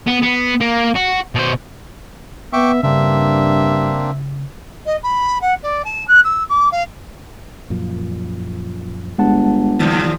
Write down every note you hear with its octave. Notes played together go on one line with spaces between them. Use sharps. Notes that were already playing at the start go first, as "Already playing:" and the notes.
B3
B3
A#3
F#4
B2 C5
B3 E5 G5 C#6 D6
G2 C#3 A#3 C4 D4 E5
D#5
B5
F#5
D5
A5
F#6
E6
D6
F5
F#2 A#2 F3
G1 G#3 F#5 A5
D#2 A#2 C#3 F3 G3 B3